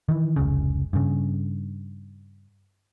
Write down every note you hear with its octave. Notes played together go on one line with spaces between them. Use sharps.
D#3 E3
F1 C#2 C#3
G2 C#3